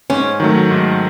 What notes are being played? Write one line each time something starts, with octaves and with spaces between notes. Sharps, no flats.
G#2 C#4
D#3 F#3 A3
G#2